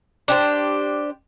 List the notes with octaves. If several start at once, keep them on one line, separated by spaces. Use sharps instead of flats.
D4 G4 C5